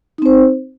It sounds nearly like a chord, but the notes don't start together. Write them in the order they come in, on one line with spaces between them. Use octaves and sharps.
D#4 C4 C5